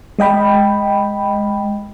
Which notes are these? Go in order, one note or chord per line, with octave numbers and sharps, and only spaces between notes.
G#3 D#5 G5 B5